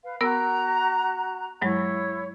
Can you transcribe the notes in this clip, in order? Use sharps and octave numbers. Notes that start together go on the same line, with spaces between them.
B4 F5
B3 F#4 A#4 A#5 E6
G2 F#3 G#3 E4 C#5